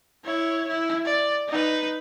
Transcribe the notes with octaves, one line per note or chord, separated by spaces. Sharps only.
E4 C#5
E4
D5
D#4 B4